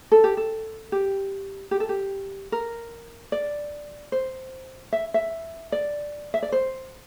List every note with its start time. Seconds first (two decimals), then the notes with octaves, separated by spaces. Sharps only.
0.12 A4
0.24 G4
0.37 A4
0.92 G4
1.71 G4
1.80 A4
1.89 G4
2.52 A#4
3.32 D5
4.12 C5
4.93 E5
5.14 E5
5.72 D5
6.34 E5
6.43 D5
6.52 C5